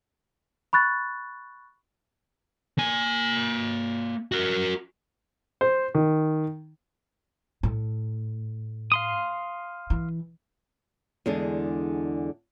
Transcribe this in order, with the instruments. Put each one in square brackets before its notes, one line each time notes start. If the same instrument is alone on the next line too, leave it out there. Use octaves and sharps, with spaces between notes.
[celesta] B5 C#6 F#6 A6
[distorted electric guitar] A#3 G#5
F#4 A#4
[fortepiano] C5
D#3
[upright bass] A2
[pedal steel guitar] F5 C6 D#6
[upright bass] E3
[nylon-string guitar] E2 D3 G#3 D4